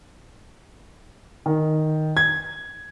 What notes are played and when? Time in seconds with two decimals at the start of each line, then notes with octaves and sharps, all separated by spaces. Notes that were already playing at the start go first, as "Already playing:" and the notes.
1.46 D#3
2.17 G#6